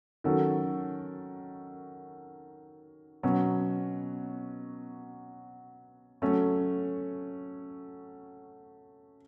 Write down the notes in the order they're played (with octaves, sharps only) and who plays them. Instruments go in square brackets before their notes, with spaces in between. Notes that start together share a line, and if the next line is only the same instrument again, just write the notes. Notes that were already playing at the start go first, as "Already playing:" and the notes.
[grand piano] D#3 F#3 C#4 F#4 A4
B2 F#3 C#4
F#3 A3 C#4